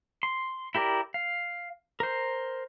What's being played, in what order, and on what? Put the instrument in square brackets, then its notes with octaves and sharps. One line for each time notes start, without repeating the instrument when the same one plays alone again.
[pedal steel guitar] C6
E4 G4 A#4 D5
F5
A#4 C5